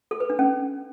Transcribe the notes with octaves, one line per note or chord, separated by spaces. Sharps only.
A4
B4
D4
C#4